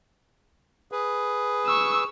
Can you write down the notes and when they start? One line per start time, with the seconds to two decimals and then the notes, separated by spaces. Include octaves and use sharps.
0.92 G#4 B4
1.67 C#6 E6